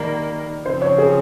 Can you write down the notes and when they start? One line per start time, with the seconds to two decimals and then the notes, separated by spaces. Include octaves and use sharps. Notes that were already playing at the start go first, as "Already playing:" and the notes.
Already playing: D#3 G3 A#3 A#4
0.65 C#3 F3 C4 C5
0.82 C#5
0.98 G#4